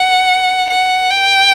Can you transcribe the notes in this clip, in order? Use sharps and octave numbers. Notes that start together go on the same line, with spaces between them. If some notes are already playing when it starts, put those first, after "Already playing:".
Already playing: F#5
F#5
G5